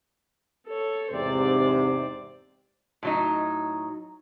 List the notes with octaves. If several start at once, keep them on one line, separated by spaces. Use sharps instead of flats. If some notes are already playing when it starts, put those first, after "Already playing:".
A4 C#5
E2 G#2 C3 C5 D5
A2 F#3 D#4